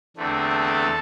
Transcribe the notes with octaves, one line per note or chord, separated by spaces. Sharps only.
E2 D3 A3 C4
A4